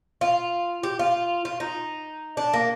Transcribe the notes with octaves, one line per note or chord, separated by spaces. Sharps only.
F4
G4
F4
F4
D#4
D4
A#3